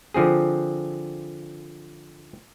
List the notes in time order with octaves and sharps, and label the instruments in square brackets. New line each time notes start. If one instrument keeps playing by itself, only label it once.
[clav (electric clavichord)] D3 F3 C4 G#4